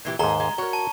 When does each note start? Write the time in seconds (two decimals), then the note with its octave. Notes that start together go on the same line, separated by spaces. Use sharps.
0.05 A#2 E3 G4
0.19 D#2 G#2 G#4 A4 A#5 G7
0.40 G#3
0.58 F#4 A#4 C#5
0.73 A5